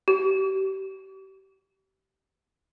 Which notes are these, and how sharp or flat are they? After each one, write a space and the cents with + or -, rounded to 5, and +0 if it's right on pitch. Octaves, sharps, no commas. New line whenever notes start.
G4 -35